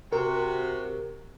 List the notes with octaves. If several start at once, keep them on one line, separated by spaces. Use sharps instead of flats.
C3 F#4 A#4